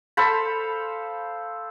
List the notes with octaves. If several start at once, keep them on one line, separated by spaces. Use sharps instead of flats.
A4 C5 F5 B5